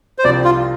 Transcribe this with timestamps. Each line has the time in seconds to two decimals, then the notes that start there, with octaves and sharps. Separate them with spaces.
0.19 C5
0.24 C2 C3 F3 D4 D5
0.45 F4